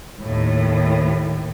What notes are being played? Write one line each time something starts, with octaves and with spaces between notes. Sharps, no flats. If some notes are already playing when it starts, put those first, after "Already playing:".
D#2 A2